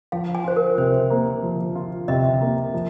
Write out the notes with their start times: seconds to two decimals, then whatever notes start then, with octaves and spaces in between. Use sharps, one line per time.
0.12 F3 F5
0.35 G#5
0.44 F4 C5
0.56 A#4
0.78 C3 C5
1.10 A#3
1.43 F3
1.75 F4
2.08 C3 D#5
2.41 A#3
2.74 F3